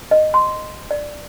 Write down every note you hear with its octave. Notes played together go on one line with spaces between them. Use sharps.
D#5
C6
D5